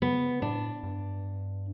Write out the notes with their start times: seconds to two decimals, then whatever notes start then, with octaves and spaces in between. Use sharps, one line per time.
0.02 C#3 B3
0.42 A2 D4
0.83 G2